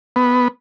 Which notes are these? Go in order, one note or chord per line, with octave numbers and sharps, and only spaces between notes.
B3